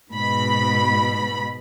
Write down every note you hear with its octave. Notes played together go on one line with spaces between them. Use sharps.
G#2 B2 B5